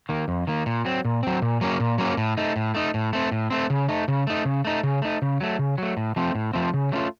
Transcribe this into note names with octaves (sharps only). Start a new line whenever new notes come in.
D#3 A#3
F2
D#3 A#3
A#2
F#3 C4
A#2
F#3 C4
A#2
F#3 A#3 C#4
A#2
F#3 A#3 C#4
A2
A3 D#4
A2
A3 D#4
A2
A3 C4
A2
A3 C4
C#3
A3 D#4
C#3
A3 D#4
C#3
A3 D#4
C#3
A3 D#4
C#3
F#3 A3
C#3
F#3 A3
A2
F3 A3 C4
A2
F3 A3 C4
C#3
F#3 A3 C#4 F4